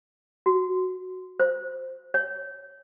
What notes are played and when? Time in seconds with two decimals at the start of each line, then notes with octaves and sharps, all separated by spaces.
0.46 F#4
1.40 C5
2.14 C#5